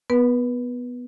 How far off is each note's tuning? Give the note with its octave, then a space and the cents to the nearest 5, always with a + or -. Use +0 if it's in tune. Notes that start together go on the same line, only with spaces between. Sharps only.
B3 +0 B4 -25